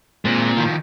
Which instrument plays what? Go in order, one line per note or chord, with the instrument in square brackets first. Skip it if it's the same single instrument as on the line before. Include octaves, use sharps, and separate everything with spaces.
[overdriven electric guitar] A#2 [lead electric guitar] G#3 C4
[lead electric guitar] D#3 F3